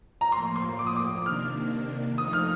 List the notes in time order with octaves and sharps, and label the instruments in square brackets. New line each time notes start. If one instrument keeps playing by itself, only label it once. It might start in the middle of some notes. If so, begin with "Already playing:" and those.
[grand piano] A#5
[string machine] A2 F3 A#3 [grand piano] C6
[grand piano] C6
D6
D#6
D6
[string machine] C3 D#3 A#3 D4 [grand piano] F6
[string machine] F3 A3 D#4 [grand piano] D#6
[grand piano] F6